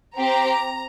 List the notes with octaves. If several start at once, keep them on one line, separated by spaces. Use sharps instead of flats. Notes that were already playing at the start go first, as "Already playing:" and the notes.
C4 G4 A#5